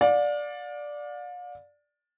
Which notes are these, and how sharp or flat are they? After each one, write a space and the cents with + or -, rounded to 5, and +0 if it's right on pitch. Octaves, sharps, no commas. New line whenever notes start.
D5 +0 F5 +40